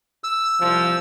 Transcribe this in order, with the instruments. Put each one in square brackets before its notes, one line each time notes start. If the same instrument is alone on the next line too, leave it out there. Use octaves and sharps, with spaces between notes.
[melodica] E6
[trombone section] C2 F3